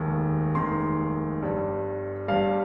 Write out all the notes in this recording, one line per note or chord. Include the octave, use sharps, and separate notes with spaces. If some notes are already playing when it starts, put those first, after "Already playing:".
Already playing: F1 D#2 D#3 G#3
F1 D#2 D#3 G#3 C6
G1 G2 G3
G1 G2 G3 F5